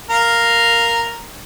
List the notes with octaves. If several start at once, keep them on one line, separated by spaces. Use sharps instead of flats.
A#4 F5